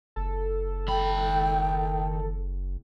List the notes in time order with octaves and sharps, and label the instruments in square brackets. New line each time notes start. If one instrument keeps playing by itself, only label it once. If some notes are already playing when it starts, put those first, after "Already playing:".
[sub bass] F#1 [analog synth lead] A4
[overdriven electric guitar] D#3 B5 [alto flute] G5